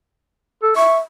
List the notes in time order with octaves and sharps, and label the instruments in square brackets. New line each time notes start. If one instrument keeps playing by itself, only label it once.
[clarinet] A4
[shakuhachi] E5 [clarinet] C#6